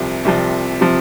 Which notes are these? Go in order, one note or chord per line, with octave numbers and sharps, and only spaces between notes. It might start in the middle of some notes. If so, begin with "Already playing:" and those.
Already playing: C2 C3 F3
C2 C3 F3
C3 F3